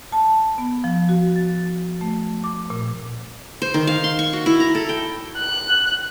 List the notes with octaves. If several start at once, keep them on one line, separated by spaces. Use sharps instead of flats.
A5
B3
F3
F#4
A6
A3
D6
A#2
C5
D#3
F5
C6
C#6
F#4
E4
A#5
A4
G5
F#6